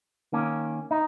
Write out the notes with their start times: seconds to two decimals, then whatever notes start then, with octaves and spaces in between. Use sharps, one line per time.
0.33 D#3 A#3 C#4
0.91 D#4